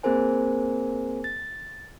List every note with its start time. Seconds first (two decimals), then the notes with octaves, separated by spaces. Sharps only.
0.03 A#3 C4 G#4 A#4 C5 G#5
1.24 A6